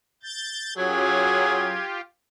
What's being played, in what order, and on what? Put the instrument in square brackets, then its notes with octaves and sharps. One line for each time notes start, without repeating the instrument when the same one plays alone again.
[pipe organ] G6 A6
[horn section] F#2 F#3 [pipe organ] F4 G4 [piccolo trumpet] G#4 [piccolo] G#6